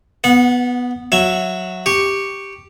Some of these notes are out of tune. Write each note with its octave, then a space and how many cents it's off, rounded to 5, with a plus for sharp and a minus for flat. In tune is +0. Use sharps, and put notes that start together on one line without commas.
B3 +0 F#5 -30
F#3 -10 E5 +0
G4 +0 C#6 +0